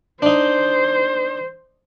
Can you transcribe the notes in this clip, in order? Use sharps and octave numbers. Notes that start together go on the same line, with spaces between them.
D4 D#4 C5